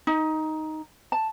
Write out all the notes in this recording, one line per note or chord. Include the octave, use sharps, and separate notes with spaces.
D#4
A5